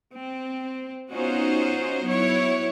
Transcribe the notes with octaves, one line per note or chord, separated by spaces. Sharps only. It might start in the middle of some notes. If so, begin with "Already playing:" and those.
C4
B3 C#4 D#4 F4 F#4 C5
F#3 B3 E4 C#5